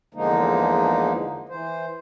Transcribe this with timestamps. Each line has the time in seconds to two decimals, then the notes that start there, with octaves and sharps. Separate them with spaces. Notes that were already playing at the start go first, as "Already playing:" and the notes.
0.14 E2 D3 F3 G#3 A#3 D#4
1.49 E3 C5